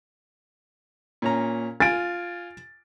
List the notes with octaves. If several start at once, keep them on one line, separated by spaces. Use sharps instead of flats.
A#2 C#4 A#5
F4 G#5 A6 D7